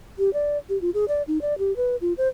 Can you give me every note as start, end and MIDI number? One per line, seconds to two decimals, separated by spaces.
0.18 0.32 67
0.33 0.58 74
0.69 0.80 67
0.81 0.90 65
0.94 1.05 68
1.08 1.22 74
1.28 1.41 63
1.41 1.57 74
1.58 1.75 67
1.76 1.96 71
2.01 2.13 65
2.17 2.28 72